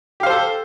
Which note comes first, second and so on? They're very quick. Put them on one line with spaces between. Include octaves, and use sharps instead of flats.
G4 F5 C5 A4